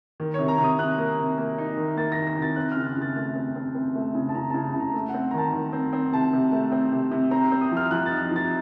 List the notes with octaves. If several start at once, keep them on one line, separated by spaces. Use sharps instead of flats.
D#3
C3 C#5
A#5
C3
D#6
C3 F#6
A#3
C3
A#3
D#4
D#3
A#3 A6
A#6
D#3
A#6
C3
A6
C4 F#6
F6
C#3
F#6
C#3
A6
A3 A6
C4
C4
C4
A3
C#3
A5
C#3 A#5
C#3 A5
A5
C#3
A#5
A3
F#5
C4
A#5
D#3 A5
D#3
C4
C4
C3 A5
C3
A3
C4
C3
C3
C4 A#5
C4
D#6
F3
F6
F3 F#6
D#4 A6
F3 A6